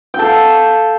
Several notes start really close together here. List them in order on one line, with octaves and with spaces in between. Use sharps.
G5 A4 F5